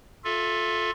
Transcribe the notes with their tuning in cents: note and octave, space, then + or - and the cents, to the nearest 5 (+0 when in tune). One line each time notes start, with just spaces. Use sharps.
F4 +20 A4 -10 E5 +10